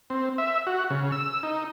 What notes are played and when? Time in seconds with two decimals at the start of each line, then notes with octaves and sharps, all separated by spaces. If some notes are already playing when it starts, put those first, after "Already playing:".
0.10 C4
0.38 E5
0.67 F#4
0.90 C#3
1.12 E6
1.43 D#4